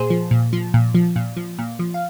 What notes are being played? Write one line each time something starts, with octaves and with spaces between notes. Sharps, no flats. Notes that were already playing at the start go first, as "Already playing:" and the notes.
Already playing: A#2 G#4 C5
F3
A#2
F3
A#2
F3
A#2
F3
A#2
F3
F5